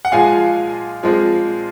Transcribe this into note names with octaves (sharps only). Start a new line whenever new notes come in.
F#5
A#2 F3 G#3 F5 G#5
A#2 F3 G#3 C4